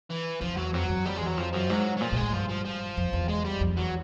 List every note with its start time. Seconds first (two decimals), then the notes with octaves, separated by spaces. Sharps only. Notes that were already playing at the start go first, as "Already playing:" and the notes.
0.10 E3
0.41 F2 F3
0.57 E2 F#3
0.74 F2 F#3
0.89 F#2
1.05 F2 G3
1.16 E2 G#3
1.26 F#3
1.38 F2 F3
1.53 F#2 F3
1.69 G#2 F#3
1.97 F#3
2.01 A#2 F3
2.12 A#2 G#3
2.22 A2
2.33 G2 F3
2.49 F3
2.65 F3
2.97 F2
3.13 E2
3.29 G#3
3.45 G3
3.61 F2
3.77 E2 F#3